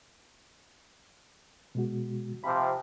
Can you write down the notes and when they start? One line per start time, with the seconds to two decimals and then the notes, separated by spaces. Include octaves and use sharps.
1.75 B2 G#3 F#4
2.44 C3 F3 B5